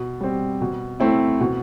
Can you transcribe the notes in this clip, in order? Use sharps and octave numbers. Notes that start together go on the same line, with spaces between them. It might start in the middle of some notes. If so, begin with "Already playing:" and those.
Already playing: B2
G3 C4
B2
A3 C4 E4
B2